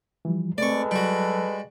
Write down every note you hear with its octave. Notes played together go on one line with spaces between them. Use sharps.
E3 F3 G3
G#3 A3 C4 A4 B4 D5 C#6
F#3 G3 F#4